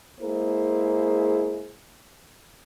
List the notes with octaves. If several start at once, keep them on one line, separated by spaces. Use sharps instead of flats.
G#3 A#3 E4 G#4 C5